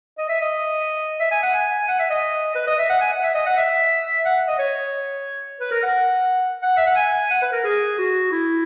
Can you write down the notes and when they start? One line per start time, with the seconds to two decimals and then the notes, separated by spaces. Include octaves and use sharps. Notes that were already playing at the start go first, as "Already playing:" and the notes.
0.18 D#5
0.29 E5
0.41 D#5
1.20 E5
1.31 G#5
1.43 F#5
1.54 G#5
1.88 F#5
1.99 E5
2.10 D#5
2.55 B4
2.67 D#5
2.79 E5
2.90 F#5
3.01 G#5
3.12 F#5
3.23 E5
3.35 D#5
3.46 F#5
3.57 E5
4.25 F#5
4.48 D#5
4.59 C#5
5.60 B4
5.71 A#4
5.83 F#5
6.62 F#5
6.77 E5
6.87 F#5
6.96 G#5
7.30 F#5
7.42 B4
7.53 A#4
7.64 G#4
7.98 F#4
8.32 E4